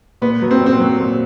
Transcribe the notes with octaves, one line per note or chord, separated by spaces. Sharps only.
A#2 B3
F#3
C4
A#2
C4
F#3
A#2